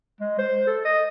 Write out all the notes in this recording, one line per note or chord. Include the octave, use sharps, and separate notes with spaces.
G#3
C5
A4
D#5